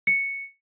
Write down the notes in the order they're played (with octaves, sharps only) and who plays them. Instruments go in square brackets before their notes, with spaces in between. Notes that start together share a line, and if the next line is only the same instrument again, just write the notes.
[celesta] C#7